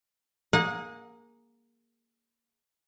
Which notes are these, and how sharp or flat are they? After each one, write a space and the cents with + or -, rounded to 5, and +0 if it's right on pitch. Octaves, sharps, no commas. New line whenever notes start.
A#3 +0 G#4 +0 F#5 -35